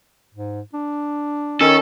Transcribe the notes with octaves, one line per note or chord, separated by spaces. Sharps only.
G#2
D4
D#3 C#4 A4